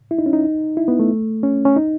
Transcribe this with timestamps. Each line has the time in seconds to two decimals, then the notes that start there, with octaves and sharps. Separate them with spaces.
0.11 E4
0.19 D#4
0.26 C#4
0.33 D#4
0.77 E4
0.88 B3
0.99 A3
1.43 C#4
1.65 C#4
1.77 D#4